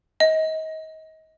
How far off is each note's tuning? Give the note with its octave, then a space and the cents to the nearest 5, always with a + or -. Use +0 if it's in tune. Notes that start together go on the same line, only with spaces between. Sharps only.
D#5 +30